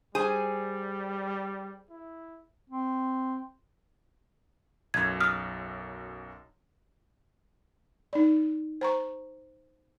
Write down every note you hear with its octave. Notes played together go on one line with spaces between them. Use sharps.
G3 G#4 C5 G#5
E4
C4
B1 F#2 G#6
D#6 F6
D#4 D5
C5 A#5 C#6